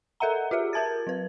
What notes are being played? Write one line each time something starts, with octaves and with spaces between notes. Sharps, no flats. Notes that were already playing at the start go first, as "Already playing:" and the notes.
A4 A#4 E5 F#5 A#5
F4 G4 G#4 E5
A#4 A5 G#6 A6
F#3 B4